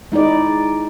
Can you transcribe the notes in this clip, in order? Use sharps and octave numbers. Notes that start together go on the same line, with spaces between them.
G#3 D#4 E4 D5